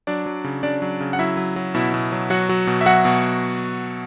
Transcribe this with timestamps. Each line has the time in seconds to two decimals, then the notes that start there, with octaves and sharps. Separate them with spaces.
0.07 F#3 D4 D5
0.26 F#3
0.44 C#3
0.63 C#3 D4 D5
0.82 F#3
1.00 C#3
1.13 F#5
1.19 F#3 E4 E5
1.37 F#3
1.56 F#3
1.74 B2 E4 E5
1.94 B2
2.12 F#3
2.30 F#3 F#4 F#5
2.49 F#3
2.67 B2
2.81 E5
2.86 F#3 F#4 F#5
3.05 B2